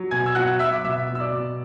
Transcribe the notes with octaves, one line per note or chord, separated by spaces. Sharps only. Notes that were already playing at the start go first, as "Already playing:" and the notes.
Already playing: F#3
B2 G#5 G#6
E6
F#3 F#5 F#6
F#3 E5 E6
D6
B2 E5 E6
F#3
E6
D5 D6
B2